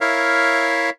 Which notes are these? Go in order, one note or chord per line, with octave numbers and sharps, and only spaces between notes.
E4 A#4 C#5 E5 F5